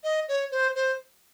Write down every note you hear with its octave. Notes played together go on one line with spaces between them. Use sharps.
D#5
C#5
C5
C5